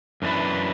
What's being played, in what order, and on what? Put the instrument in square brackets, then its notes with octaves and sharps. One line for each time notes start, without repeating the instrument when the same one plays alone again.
[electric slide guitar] F#2 E3 D4 B4